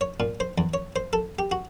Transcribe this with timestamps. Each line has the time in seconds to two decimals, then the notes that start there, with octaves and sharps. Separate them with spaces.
0.01 C#5
0.20 A#2
0.40 C5
0.58 E2
0.74 C#5
0.96 C5
1.13 A4
1.39 G4
1.51 F#4